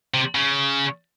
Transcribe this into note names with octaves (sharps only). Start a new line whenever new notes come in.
C3
C#3